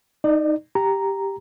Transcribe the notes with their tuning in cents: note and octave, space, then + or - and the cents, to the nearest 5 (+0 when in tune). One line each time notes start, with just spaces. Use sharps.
D#4 +0 D5 +30
G4 +0 A#5 +0